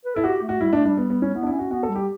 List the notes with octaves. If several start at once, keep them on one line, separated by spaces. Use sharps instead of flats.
B4
E4 A4
F#4 G4
A3
F#4
G3 E4
A3 D4
G3 D4
B3
B3
C#4
B3 E4
D4
E4
C#4
F#4
B3 F#4
A4
G3
G4